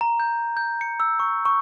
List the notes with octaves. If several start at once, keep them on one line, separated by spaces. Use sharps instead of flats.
A#5
G6
G6
C#7
E6
C#6
C#6